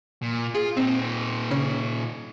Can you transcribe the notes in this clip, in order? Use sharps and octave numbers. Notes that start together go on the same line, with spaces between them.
A#2
F4 G#4
A#2 C4 D#4
C#3 C#4